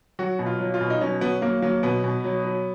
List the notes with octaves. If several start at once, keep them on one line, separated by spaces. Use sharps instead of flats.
F#3 F#4
B2
F4
F#3
F4
B2
D#4
F#3 C#4
F#3 B3
F#3 A#3
F#3 A#3
B2 B3
B2
F#3
F#3